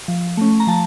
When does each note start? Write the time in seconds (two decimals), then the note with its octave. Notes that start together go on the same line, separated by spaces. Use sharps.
0.08 F3
0.37 A3 C#4
0.60 A#5
0.67 F3 A5